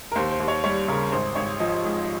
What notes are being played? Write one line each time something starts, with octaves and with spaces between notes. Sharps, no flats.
A#4
D#2 C5
C5
D#2
C#5
G3 C#5
C#3 A#4
G#1 C5
G#1 C#5
F3 D#5
G#2